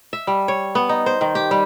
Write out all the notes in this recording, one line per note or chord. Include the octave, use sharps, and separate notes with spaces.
E5
G3
C#5
B3
D#4
C5
D#3
G4
G3